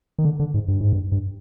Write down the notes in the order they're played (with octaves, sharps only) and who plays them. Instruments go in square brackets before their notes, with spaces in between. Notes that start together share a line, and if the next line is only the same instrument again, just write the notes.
[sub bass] D#3
D3
D3
G#2
G2
G#2
G2
G2